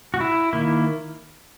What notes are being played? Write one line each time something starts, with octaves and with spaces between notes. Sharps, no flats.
F#4
E4
D#3 A#3 E4